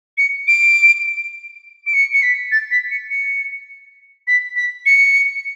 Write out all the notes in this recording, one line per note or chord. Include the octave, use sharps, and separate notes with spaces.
C#7
D7
D7
C#7
C#7
B6
A6
B6
C#7
C#7
B6
B6
C#7